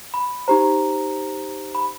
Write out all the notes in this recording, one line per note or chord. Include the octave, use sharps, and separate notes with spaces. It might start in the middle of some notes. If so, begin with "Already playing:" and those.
B5
D#4 G4 C5 A#5
B5